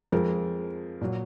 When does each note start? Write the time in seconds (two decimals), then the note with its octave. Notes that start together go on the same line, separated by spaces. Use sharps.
0.12 F2 F3 G#3 A#4
1.01 A#2 F#3